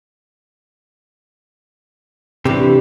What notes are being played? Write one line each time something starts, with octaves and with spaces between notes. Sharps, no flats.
D2 C3 E3 G4